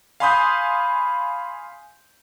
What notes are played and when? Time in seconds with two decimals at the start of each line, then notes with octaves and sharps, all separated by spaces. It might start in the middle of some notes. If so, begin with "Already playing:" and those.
0.20 F5 G#5 B5 C6 D#6 G6